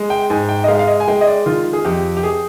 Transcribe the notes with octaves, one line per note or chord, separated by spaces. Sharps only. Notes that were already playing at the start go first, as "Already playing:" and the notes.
Already playing: G#3
G5
G#2 G#5
G5
D#5
G#3 F5
F5
D#5
G#5
G#3 G5
D#5
D5
D#3 F4
G#4
F2 G4
G4
G#4